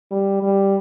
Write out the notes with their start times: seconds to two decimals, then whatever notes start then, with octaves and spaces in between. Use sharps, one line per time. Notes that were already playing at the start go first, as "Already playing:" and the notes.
0.11 G3
0.43 G3